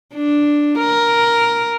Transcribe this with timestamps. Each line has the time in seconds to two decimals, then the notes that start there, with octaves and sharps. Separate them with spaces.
0.15 D4
0.79 A#4